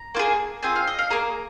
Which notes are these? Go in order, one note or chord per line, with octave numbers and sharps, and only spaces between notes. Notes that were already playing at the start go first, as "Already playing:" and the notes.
Already playing: A#5
A#3 F4 G#4
C4 F4 G#4 G#5
F5
D#5
F5
A#3 G#4 A#5